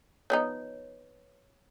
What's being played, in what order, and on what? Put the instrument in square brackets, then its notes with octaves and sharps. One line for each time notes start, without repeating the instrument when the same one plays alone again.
[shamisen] F3 B3 D#4 [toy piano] C#5